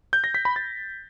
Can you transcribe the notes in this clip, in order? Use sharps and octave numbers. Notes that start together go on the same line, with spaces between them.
G6
A#6
B6
B5
A6